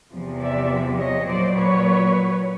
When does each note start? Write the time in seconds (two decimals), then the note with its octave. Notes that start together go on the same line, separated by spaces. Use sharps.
0.13 E2 C3 F3
0.41 D5 E5
0.98 C#5 D#5
1.27 A#2 F#3 C5 D5
1.56 B4 C#5